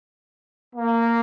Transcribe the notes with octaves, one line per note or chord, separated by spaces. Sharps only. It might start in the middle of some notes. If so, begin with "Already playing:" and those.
A#3